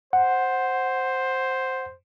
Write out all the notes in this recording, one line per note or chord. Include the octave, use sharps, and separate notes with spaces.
C5 F#5